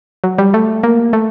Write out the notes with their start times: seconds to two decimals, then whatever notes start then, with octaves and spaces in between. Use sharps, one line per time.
0.24 F#3
0.38 G3
0.54 A3
0.83 A#3
1.13 A3